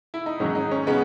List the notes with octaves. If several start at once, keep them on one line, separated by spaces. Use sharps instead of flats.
E4
D#4
G#2 D#3 F#3 C#4
D#4
C#4
C#3 G#3 B3 C#4